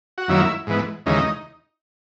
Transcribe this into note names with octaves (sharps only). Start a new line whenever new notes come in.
F#4
F#2 D#3 F#3 A#3 E4
G#2 E3 B3
D#2 C#3 E3 G#3 D#4